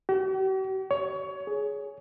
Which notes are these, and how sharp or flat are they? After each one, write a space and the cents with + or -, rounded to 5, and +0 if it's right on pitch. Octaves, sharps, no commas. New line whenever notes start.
G4 -45
C#5 +20
G#4 +10